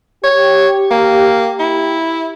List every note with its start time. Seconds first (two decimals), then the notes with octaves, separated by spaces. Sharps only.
0.24 G4 C#5
0.91 A#3
1.60 E4